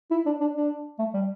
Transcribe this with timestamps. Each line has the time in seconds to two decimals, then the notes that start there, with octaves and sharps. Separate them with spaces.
0.11 E4
0.26 D4
0.41 D4
0.56 D4
0.99 A3
1.14 G3